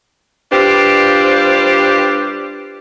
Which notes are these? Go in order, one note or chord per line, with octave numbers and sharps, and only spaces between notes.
G3 D4 F4 G4 B4 C5